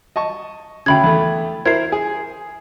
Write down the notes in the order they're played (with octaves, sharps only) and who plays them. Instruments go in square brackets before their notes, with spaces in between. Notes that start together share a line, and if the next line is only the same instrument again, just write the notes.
[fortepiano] D#5 A5 C#6
[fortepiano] D2 C#3 [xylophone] G5 B5 G#6
[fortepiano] E2 A3
[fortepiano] E4 A#4 C5 [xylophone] G#6 C7
[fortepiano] G#4